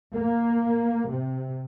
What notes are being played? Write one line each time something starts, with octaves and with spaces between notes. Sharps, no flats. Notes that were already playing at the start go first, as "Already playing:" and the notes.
A#3
C3